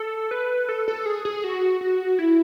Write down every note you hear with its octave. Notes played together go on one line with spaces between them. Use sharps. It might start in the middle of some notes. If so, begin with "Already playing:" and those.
Already playing: A4
B4
A4
A4
G#4
G#4
F#4
F#4
E4